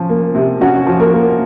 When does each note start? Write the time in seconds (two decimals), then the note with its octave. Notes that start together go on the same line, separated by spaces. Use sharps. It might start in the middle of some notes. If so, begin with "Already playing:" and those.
Already playing: F3 C#4
0.09 A#3
0.35 C3
0.61 F#3 C#4 F#4
0.86 F3
0.99 A#3 A#4
1.13 A#3